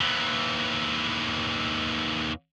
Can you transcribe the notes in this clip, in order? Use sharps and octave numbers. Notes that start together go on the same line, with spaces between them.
D#2 E3